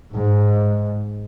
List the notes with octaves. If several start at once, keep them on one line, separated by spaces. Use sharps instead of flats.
G#2